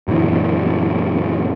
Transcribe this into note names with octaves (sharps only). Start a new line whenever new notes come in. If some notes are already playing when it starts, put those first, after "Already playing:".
F#2 A#2 D3 E3